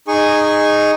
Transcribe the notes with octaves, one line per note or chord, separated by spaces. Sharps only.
D#4 G#4 G#5 C#6